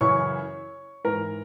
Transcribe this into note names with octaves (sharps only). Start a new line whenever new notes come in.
F#2 C#3 E3 C#5 C#6
G#2 E3 A#4 A#5